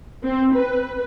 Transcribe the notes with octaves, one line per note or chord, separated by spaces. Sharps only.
C4
B4